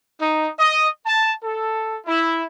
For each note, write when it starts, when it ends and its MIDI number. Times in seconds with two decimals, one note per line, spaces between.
0.20 0.50 63
0.59 0.89 75
1.06 1.32 81
1.43 1.96 69
2.07 2.45 64